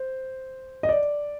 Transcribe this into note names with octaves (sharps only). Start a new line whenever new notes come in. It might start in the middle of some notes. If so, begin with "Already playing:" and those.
Already playing: C5
D#5
D5